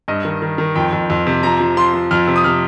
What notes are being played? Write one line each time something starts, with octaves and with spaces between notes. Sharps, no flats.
G2 D#5
D#3
D#3
D#3
F2 G5
F2
F2
C3
F3 A#5
F3
F3 C6
F3
F2 F6
C3
D#6
C3 F6